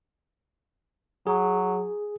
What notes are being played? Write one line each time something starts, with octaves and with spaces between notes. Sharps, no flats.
F#3 G#4